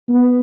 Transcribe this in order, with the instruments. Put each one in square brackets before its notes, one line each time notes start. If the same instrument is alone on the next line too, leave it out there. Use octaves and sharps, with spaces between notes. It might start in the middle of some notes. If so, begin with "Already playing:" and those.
[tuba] B3